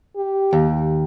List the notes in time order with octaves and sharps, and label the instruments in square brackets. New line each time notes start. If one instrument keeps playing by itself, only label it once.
[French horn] G4
[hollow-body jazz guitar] D#2